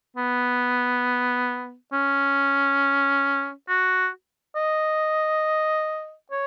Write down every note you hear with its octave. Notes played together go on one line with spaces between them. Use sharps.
B3
C#4
F#4
D#5
C#5